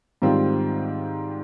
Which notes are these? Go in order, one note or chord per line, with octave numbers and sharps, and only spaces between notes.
G#2 D#3 G3 C4 F4